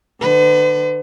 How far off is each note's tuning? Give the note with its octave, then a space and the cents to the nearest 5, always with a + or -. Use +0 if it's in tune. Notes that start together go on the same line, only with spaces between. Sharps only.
D3 +40 B4 +45